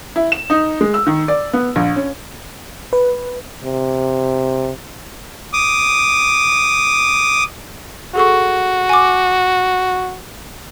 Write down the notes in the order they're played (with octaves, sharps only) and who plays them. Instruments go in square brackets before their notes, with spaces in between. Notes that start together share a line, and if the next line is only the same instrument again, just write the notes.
[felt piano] E4
E7
D#4
G#3
E6
D#3
D5
B3
A#1
C#4
[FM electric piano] B4
[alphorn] C3
[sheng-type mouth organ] D6 D#6
[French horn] F#4 [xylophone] G#4 A4 C#6
[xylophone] G#5 D6